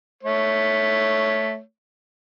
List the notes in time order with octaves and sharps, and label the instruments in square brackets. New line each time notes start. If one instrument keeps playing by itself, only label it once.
[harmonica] A3 C#5